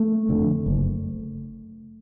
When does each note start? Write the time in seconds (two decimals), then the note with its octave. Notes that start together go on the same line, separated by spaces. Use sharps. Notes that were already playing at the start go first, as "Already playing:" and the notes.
Already playing: A3
0.29 F2 D3
0.66 F#1